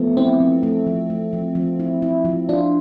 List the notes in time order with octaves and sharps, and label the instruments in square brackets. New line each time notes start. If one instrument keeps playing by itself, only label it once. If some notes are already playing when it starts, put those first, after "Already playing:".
Already playing: [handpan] F3 A3 [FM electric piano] B3 C4
[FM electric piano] C4 [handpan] E4
[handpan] F3
A3
F3
A3
F3
F3
E4
E4
F3
[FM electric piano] D4 [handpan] F4